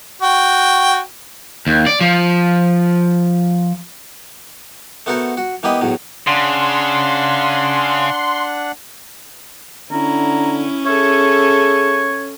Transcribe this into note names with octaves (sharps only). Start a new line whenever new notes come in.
F#4 G5
D#2
D5
F3
A3 B3 F#4 A4 A#4 C5
F#4
E3 A#3 B3 G4 D#5 B5
E2 A2 F#3
C#3 D4 F#5 C6
D3 C#4 E4 A#5
G#4 A4 C#5 E5